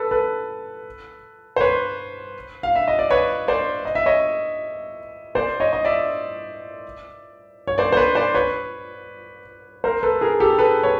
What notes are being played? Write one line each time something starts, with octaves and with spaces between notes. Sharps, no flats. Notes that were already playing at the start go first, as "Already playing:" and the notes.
Already playing: A4 B4
A4 B4
C5
B4 C#5
F5
E5
D#5
D5
B4 C#5
C5 D5
D#5
E5
C#5 D#5
C5 D5
C#5 D#5
D#5
D5 E5
C#5
C5 D5
C5
B4 C#5
C5 D5
B4 C#5
A#4 C5
A4 B4
G#4 A#4
G4 A4
A4 B4
B4 C#5